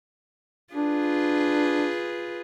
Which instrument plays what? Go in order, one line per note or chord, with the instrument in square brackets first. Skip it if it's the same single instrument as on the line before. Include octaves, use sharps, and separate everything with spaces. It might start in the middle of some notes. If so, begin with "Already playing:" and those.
[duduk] D4 [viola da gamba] F4 G#4 B4